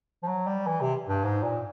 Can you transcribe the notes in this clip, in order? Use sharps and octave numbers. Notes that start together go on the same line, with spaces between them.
F3
F#3
G3
E3
C3
G2
G#2
A#2